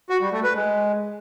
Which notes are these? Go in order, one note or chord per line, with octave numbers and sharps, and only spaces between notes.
F#4
G3
A3
B4
G#3